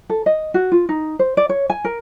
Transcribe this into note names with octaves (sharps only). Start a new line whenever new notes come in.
A4
D#5
F#4
F4
D#4
C5
D5
C#5
G#5
A#4